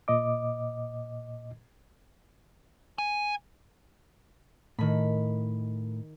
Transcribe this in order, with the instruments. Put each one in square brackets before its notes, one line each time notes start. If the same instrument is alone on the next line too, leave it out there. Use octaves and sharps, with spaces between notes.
[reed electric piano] A#2 D#5 D6
[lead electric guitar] G#5
[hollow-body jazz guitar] A2 [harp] D#3 B5